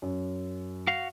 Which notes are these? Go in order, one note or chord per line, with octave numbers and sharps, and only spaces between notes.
F#2
F#4 F5